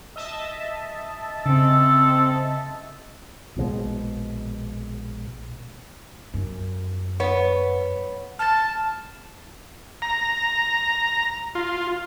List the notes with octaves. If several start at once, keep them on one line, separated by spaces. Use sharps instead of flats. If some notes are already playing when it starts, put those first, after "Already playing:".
D#5 E5 A5
C#3 C4 A4
A#1 B2 E3 G#3
F#2
B3 C#5
A5 F6 A6
A#5
F4